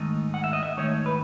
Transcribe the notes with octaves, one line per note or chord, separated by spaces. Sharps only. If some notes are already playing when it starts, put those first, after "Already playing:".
Already playing: G#2 D#3 A3 D#4
F#5
E5
D#5
E5
G#2 D#3 A3 D#4 C#5
B4